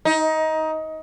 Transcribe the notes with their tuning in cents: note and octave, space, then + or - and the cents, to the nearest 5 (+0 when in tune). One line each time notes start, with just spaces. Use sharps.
D#4 +20